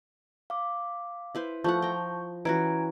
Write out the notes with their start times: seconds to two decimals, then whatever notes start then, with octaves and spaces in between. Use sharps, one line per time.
0.50 F5 D6
1.35 E4 B4 C5
1.64 F3 A3 F#5 A5 C#6 G6
1.82 G5 A#5
2.45 E3 C#4 F#4 A#5 G#6 D7